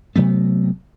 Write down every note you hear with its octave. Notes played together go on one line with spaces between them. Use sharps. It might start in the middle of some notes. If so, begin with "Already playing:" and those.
C3 F#3 A3 B3